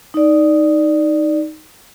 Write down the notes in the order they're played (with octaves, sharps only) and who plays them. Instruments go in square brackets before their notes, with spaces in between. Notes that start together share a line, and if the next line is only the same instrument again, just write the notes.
[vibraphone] D#4 D5